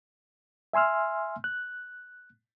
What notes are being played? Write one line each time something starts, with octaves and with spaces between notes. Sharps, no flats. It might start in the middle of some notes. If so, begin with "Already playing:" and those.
E5 G#5 C6 E6 F6
F#6